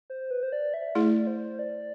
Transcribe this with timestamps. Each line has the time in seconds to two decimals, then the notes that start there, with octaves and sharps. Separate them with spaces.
0.10 C5
0.31 B4
0.43 C5
0.53 D5
0.74 E5
0.95 A3 E4 G#4 D5
1.27 C5
1.59 D5